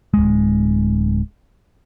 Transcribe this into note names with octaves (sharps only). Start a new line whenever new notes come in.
D1 G#3